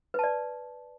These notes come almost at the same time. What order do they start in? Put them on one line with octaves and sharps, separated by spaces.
B4 A5 D5